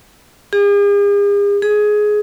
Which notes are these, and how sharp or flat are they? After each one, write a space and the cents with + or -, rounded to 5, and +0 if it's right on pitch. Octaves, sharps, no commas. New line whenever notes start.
G#4 -45
G#4 +15